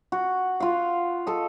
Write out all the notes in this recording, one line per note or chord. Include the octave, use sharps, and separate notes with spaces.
F#4
F4 F5
A4 D#5